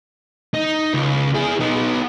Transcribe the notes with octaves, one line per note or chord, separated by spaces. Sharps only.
D#4
C#2
E4 G#4
B3 D#4